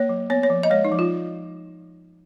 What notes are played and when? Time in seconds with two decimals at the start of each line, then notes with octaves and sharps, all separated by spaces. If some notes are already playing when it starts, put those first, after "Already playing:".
Already playing: A#3 C#5
0.09 F#3
0.30 B3 C#5
0.43 C#5
0.50 F3
0.63 D#5
0.70 G#3 C#5
0.85 D#4
0.92 F3
0.99 F4